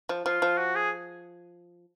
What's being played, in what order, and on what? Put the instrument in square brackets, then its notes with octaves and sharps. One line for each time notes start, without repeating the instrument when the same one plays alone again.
[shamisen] F3
[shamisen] F3 [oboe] F4
[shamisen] F3
[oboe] F#4
G#4